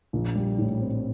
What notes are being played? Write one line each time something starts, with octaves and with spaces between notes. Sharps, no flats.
A#1
G3
A2
C4